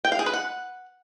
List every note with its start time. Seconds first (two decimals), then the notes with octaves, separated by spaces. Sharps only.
0.05 G5
0.12 F5
0.19 G#4
0.26 B4
0.34 F#5